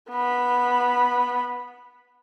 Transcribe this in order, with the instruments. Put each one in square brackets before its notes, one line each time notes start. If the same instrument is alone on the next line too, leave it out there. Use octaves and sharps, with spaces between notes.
[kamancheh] B3 B5